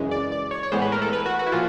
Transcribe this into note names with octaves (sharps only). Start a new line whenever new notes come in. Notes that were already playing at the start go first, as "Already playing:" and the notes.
Already playing: F#2 C#3 E3 G#3
D5
D5
C#5
C#5
A2 E3 G#3 B3 C5
B4
A#4
A4
B4
F#4
F#4
E4
A#2 F3 F4